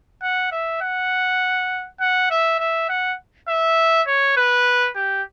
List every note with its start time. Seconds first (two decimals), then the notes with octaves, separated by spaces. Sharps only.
0.22 F#5
0.52 E5
0.81 F#5
2.00 F#5
2.30 E5
2.60 E5
2.89 F#5
3.49 E5
4.07 C#5
4.37 B4
4.96 G4